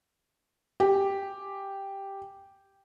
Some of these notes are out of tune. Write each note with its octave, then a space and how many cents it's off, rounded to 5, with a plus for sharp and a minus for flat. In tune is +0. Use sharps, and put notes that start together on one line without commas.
G4 +0 G#5 +0